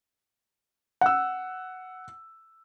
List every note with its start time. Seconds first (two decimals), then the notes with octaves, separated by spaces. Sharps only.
1.01 F#5 E6